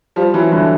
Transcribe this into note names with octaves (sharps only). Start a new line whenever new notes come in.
F3 G3
E3 F#3
D3 E3